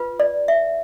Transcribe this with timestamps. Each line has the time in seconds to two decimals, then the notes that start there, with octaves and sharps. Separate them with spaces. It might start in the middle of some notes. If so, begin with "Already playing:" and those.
Already playing: F4 B4
0.20 D5
0.48 E5